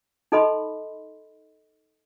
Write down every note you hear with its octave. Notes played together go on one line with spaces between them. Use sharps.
D#4 A4 D#5 B5 C6